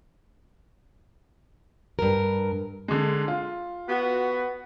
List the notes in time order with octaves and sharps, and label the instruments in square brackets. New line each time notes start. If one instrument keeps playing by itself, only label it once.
[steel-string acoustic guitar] G2 A#4
[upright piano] D3 G#3
F4
[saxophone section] B3 F#4